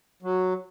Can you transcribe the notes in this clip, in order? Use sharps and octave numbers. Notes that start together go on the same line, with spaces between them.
F#3